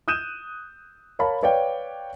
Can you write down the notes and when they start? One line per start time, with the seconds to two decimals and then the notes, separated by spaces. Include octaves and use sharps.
0.08 D#6 F#6 G6 D#7 E7
1.19 A#4 C#5 F5 A5 B5
1.43 B4 C#5 D5 F5 G5